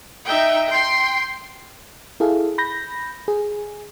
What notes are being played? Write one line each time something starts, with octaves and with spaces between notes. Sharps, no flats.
D#4 E5 G5
G5 C6
E4 G#4 A4 F5
B5 G6 A#6
G#4